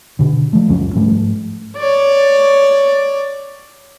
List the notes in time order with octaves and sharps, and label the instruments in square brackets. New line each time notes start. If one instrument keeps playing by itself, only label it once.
[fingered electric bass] B2 D3
F3 A3
C#2 F#2 F3 C#4
G#2 F3 G3 A3
[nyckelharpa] C#5 D5